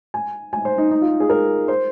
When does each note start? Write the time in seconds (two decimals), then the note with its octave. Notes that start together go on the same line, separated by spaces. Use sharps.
0.14 G#5
0.53 G#5
0.65 C5
0.78 D#4
0.91 D#4
1.01 F4
1.20 G#4
1.29 A#4
1.68 C5